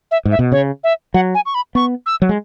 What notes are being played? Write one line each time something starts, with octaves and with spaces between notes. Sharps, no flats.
E5
G#2
E5
B2
C#3 C#5
E5
F#3 F#5
G#5
C#6
B5
B3 C#6
E6
F#3
G#3